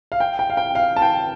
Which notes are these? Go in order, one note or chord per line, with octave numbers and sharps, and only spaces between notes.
F5
G5
G5
F5
G5
F5
A5
G5